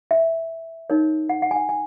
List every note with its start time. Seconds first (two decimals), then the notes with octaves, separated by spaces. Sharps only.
0.11 E5
0.90 D#4 A#4 C#5
1.29 F#5
1.42 F#5
1.51 G#5
1.56 F#5
1.69 G#5